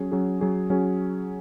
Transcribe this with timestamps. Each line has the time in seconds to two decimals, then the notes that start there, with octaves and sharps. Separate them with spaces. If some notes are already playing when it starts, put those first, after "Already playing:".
Already playing: F#3 C#4 G#4
0.12 F#3 C#4 G#4
0.41 F#3 C#4 G#4
0.70 F#3 C#4 G#4